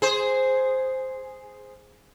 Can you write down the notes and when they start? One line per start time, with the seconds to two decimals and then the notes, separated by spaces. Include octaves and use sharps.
0.02 G#4 C5